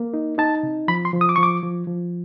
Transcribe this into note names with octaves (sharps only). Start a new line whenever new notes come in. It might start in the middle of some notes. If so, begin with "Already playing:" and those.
Already playing: A#3
D#4
D#4 A5
C3
F3 B5
C6
F3
D#6
D6
F3 C#6
D6
F3
F3